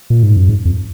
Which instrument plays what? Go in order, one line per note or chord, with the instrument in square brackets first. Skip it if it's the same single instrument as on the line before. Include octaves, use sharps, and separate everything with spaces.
[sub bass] A#2
G#2
F#2
G#2
F2